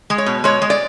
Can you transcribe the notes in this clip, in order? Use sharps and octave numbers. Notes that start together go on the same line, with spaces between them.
G#3
C#5
B2
G#3 C#5
G#3
D5